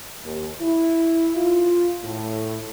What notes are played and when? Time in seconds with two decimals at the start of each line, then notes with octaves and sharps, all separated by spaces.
0.24 D#2
0.60 E4
1.35 F4
2.03 A2